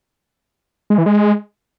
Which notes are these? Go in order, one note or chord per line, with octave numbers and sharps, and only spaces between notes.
G#3
E3
G#3